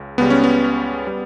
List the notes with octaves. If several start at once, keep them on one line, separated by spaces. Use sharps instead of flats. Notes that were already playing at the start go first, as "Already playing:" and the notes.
Already playing: C#2 C#3
C#2 C#3 G3 B3
C#4
B3
G3